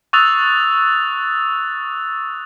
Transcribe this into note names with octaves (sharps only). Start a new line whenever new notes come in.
C#6 D#6 E6 F#6 A6 F7